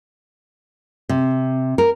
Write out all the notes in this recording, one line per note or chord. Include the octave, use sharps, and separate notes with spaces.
C3
A#4